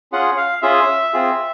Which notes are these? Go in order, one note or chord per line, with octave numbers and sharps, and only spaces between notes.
C#4 F4 G#4 F#5
F5
C#4 F4 G#4 E5
C4 F4 G#4